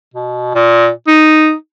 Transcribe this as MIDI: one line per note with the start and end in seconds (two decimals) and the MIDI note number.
0.14 0.52 47
0.55 0.89 46
1.07 1.53 63